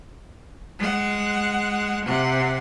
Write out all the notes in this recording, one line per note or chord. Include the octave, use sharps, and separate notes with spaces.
G#3 F#5
C3 F#5